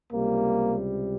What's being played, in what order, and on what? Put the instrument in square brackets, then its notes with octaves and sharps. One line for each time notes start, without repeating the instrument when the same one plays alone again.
[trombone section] C#2 C3 G3 A#3